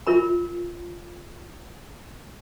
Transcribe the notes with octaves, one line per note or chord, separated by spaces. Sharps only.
F4 A#4 B5